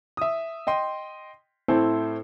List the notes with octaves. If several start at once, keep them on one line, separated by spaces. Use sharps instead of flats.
E5 D#6
D#5 G5 C6
A2 C4 E4 A4 C5